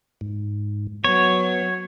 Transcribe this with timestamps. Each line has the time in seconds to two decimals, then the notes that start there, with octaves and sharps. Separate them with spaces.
0.21 G#2
1.04 F#3 B3 C#5